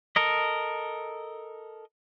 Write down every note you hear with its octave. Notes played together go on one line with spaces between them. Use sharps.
A4 A#4 D#5